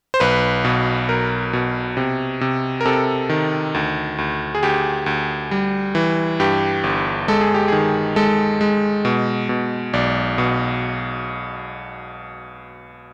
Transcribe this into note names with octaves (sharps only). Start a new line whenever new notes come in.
C5
B1 B4
B2
B1 A#4
B2
C3
C3
A#4
C3 A4
D#3
D2
D2
G#4
D2 G4
D2
G3
E3
G2 G4
G1
G#3 A4
G#4
G4
D#3 G#4
G#3 A4
G#3
B2
B2
B1 D5
B2